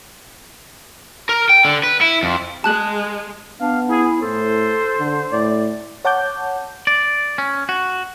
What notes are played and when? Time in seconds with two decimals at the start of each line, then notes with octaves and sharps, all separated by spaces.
1.29 A#4
1.49 G5
1.65 D3
1.83 B4
2.01 E4
2.23 F2
2.64 G#3 A5 F#6 F#7
3.61 B3 D4 F5
3.89 E4 G#4
4.22 A2 A4 C5
4.98 D3
5.32 A2 D5
6.05 C#5 F#5 A5 D6 G6
6.87 D5
7.38 C#4
7.69 F#4